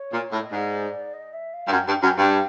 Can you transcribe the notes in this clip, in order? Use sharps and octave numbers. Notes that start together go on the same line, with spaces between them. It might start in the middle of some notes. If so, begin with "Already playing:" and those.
Already playing: C#5
A#2
A2
D#5
G#2 D5
D#5
E5
F5
G2
F#2 G5
G2 G5
F#2 G5
G2 G5